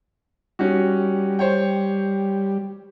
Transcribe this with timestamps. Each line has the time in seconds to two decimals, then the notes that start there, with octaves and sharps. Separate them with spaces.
0.59 G3 C#4 D#4 F#4
1.39 C5 C#5 G5